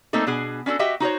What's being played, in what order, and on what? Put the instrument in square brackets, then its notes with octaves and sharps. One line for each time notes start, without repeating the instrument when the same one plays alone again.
[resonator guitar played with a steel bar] A3 A#3 C4 D#4 A4
B2 D4 G#4 G#5
C#4 D4 F#4 A4
F#4 G4 D#5 E5 G5
D#4 F#4 C5 C#5